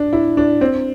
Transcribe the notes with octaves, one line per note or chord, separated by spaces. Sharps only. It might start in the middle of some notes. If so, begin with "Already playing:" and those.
Already playing: D4
E4
D4
C4